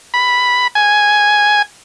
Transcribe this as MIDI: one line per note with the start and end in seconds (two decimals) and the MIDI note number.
0.14 0.67 83
0.75 1.62 80